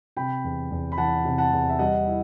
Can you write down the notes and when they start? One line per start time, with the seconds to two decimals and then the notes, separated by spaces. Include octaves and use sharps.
0.16 C3 G5 B5
0.44 E2
0.71 E2
0.92 B5
0.97 E3 F#5 A5
1.25 C3
1.38 F#5 A5
1.52 E2
1.69 E5
1.79 G3 D#5 F#5
2.07 E4